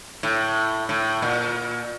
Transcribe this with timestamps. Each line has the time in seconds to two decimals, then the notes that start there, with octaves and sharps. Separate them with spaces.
0.23 A2
0.89 A2
1.22 A#2